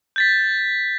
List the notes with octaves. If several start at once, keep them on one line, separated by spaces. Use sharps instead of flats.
G6 A6 B6